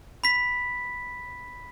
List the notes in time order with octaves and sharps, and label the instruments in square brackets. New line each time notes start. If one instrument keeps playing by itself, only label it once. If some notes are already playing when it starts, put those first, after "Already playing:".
[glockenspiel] B5 B6